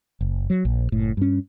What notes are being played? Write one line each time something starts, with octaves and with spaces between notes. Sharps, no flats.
F#1
F#3
A#1
F#1 A2
G2 C#4